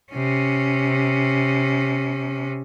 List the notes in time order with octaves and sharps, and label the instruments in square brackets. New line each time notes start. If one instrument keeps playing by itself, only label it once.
[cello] C3 C#4